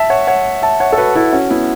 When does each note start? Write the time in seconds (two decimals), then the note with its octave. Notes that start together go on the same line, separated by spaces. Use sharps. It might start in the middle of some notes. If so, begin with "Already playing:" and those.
Already playing: E5 A5
0.10 C#5 F#5
0.27 C#5 F#5
0.62 E5 A5
0.80 C#5 F#5
0.93 A4
0.98 F#4 B4
1.15 E4 A4
1.32 C#4 F#4
1.50 B3 E4